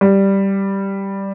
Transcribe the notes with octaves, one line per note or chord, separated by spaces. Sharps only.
G3